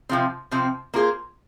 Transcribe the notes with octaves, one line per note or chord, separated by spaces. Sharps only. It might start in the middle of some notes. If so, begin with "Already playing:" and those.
C3 F3 C4
C3 F3 C4
A#3 F4 G#4 C5